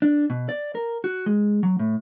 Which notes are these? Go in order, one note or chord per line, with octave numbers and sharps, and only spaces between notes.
D4
B2
D5
A#4
F#4
G#3
F#3
A2